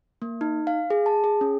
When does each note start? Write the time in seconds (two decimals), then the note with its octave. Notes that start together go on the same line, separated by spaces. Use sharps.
0.22 A#3
0.41 D#4
0.67 F5
0.90 G#4
1.06 A5
1.24 G#4
1.41 C#4